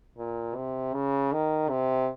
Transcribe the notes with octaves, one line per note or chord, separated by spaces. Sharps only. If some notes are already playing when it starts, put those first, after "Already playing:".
A#2
C3
C#3
D#3
C3